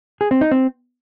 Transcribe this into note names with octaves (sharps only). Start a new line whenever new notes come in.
G#4
C4
D#4
C4